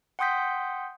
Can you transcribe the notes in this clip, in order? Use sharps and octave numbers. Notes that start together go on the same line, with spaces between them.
F#5 G5 C6 D#6 G6 B6